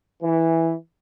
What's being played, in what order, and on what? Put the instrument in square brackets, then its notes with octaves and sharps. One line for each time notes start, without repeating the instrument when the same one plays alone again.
[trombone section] E3